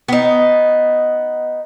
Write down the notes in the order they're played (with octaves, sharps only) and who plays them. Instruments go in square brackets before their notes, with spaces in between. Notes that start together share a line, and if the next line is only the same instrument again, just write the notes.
[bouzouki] B3 D#4